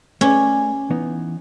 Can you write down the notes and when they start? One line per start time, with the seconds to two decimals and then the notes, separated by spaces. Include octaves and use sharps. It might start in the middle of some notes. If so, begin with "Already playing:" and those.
0.21 A3 C#4 B4 D5
0.90 E3 B3 D#4